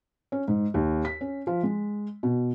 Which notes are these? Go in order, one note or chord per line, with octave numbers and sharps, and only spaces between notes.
C#4
G#2
D#2
B6
C#4
F3
G#3
B2